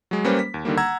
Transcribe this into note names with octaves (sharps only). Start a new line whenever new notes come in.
F#3 G#3
G3 A#3 C#4 B4 C5
B6
D#2
D3 D#3 G3 A#3
F#5 A#5 E6 G#6